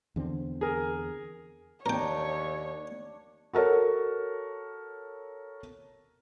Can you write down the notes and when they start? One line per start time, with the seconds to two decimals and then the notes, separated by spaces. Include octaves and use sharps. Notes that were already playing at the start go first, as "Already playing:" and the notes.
0.16 E2 D3 C4
0.61 G#4 A#4
1.86 D#2 D4 A#4 C#5 G5
3.53 F#4 A4 A#4 C#5